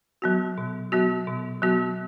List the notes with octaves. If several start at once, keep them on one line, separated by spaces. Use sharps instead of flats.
F#3 B3 F#4
B2
F#3 B3 F#4
B2
F#3 B3 F#4